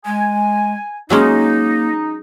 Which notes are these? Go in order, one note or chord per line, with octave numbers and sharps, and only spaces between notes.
G#3 G#5
F#3 G#3 A#3 C#4 D#4